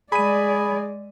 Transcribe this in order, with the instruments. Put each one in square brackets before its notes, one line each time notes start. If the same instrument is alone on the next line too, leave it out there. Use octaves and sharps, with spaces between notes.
[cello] G#3 D5 [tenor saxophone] G#4 [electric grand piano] B5 D#7